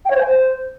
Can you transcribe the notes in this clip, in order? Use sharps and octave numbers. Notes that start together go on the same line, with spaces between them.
G5
C#5
C5
G#5
C5